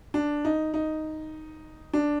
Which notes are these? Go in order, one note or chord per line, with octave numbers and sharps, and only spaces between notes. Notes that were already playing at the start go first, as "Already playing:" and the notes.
D4
D#4
D#4
D4